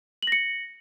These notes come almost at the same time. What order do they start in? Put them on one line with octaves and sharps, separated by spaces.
F#7 A#6 C#7